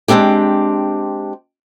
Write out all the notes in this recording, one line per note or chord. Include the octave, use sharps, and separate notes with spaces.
G#3 A#3 C4 D4 G4